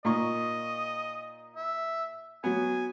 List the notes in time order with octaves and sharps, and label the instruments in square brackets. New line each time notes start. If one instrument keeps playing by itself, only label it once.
[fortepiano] A#2 D#4 C#6 [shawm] D#5
[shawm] E5
[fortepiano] F#3 B3 [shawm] G#5